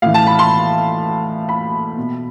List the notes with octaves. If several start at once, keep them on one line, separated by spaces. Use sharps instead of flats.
A2 E3 F5
A5
B5
C6
B5
B2